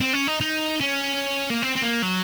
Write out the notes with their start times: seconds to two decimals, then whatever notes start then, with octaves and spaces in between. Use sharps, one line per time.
0.01 C4
0.13 C#4
0.27 D#4
0.41 D#4
0.81 C#4
1.50 A#3
1.62 C4
1.76 C4
1.82 A#3
2.02 F#3